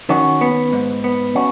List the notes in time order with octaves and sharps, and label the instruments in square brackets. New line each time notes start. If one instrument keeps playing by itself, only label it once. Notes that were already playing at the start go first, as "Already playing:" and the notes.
[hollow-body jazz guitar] D#3 [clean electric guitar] C#4 F#4
[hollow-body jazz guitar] B3
G#2
B3
[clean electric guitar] C#4 F#4